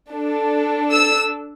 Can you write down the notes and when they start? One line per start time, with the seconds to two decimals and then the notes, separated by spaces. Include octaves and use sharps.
0.12 D4 A4
0.92 E6